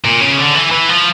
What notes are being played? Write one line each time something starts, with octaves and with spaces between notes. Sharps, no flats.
A#2
C#3
D3
E3
E3
F3